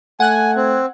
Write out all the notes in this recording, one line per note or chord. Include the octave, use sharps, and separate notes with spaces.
A3 F#5 G#5 F#6 G#6
C4